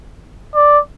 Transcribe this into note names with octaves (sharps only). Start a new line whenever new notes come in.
D5